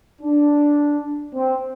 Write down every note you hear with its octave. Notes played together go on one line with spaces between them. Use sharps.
D4
C4